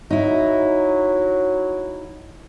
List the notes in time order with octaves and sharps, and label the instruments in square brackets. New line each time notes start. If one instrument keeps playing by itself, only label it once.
[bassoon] F#3 [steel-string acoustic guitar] D#4 E4